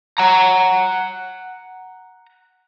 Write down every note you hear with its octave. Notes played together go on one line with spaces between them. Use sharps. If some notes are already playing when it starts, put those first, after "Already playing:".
F#5 A#5